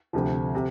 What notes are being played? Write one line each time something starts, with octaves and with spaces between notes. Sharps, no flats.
D2 C3 F3
C3